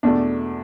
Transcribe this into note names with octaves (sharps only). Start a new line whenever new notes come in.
E2 B2 A3 D4